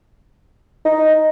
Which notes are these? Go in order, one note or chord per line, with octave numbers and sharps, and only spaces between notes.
D#4